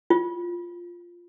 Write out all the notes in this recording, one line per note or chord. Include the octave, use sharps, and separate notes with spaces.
F4